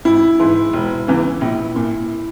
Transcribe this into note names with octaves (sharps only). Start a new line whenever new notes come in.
G#1 E4
G#2 E3
E1
E2 C#3 E3
A#1
A#2